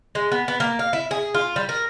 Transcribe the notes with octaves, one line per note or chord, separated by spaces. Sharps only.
G#3
B3
B3
A#3
F5
E4
G#4
F4
G3
A#4